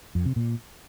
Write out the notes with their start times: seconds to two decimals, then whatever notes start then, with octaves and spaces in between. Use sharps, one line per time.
0.15 F2
0.26 C3
0.36 A#2